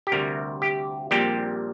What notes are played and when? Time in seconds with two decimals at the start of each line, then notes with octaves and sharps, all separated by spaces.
0.07 G4
0.12 D2 C3 G3 A#4
0.62 G4
1.11 A#1 A#2 G3 C4 G4